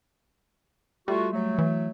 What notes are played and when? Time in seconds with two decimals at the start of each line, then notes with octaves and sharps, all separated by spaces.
1.08 G3 A3 F4 F#4
1.32 F#3 A3
1.58 E3